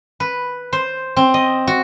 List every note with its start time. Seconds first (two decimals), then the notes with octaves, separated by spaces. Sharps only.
0.20 B4
0.73 C5
1.17 C4
1.34 D#5
1.67 F#4